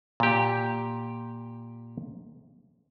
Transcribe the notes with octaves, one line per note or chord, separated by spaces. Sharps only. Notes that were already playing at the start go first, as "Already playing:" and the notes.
A#2 G4